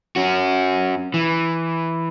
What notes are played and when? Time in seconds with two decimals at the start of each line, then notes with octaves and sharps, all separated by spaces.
0.16 C#4 F#4
1.14 E3